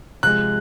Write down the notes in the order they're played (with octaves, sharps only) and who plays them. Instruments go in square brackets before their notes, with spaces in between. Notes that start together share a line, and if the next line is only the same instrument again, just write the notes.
[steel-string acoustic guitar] C3 F3 G#3 [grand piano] F#6